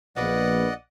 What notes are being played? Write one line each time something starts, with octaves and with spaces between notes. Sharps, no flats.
A#1 A#3 B3 B4 D5 D#5 F#5